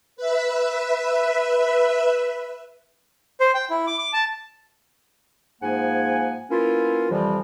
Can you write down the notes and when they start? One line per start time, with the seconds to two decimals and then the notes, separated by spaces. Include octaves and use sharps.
0.17 B4 E5
3.40 C5
3.54 G5
3.70 E4
3.87 D6
3.98 D6
4.13 A5
5.62 G#2 F3 A#3 F#5 G#5
6.51 A#3 B3 C#4 E4 F4
7.10 F2 C3 E3 F3 G3